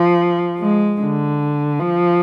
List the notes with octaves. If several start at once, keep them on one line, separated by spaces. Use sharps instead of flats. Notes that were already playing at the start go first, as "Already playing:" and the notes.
Already playing: F3
G#3
D3
F3